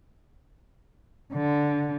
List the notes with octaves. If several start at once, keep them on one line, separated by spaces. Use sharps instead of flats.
D3